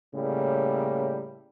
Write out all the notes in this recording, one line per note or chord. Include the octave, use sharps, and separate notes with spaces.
A2 C#3 G3 A#3